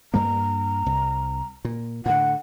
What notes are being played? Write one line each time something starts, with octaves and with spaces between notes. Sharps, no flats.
G2 G3 A#3 A#5
C2
A#2
A2 D3 F#5